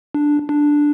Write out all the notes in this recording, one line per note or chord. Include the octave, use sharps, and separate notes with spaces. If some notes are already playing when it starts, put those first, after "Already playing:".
D4
D4